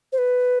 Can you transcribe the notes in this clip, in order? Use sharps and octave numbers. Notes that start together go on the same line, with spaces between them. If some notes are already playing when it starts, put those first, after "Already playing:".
C5
B4